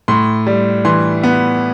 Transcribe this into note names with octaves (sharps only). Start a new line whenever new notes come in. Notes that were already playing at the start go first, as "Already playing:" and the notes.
A2 C6
G3
E3 C6
B3